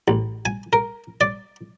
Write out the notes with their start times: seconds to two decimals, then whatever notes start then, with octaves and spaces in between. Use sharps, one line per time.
0.08 A1
0.45 G#5
0.73 A#4
1.21 D5